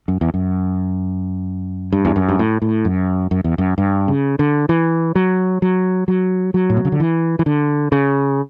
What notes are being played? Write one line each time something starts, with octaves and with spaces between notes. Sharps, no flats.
F#2
E2
F#2
G2
E2
F#2
G2
A2
A2
F#2
F#2
E2
F#2
G2
C#3
D3
E3
F#3
F#3
F#3
F#3
A2
B2
C#3
D3
E3
E3
D3
C#3